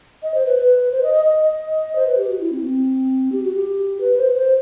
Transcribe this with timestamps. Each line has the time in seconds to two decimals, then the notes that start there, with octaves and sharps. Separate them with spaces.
0.23 D#5
0.34 C5
0.46 B4
0.58 B4
0.92 C5
1.03 D#5
1.14 D#5
1.26 D#5
1.43 D#5
1.95 C5
2.07 B4
2.18 G4
2.29 F#4
2.41 E4
2.52 C4
2.64 C4
3.32 G4
3.43 F#4
3.55 G4
4.01 B4
4.18 C5
4.29 B4
4.35 C5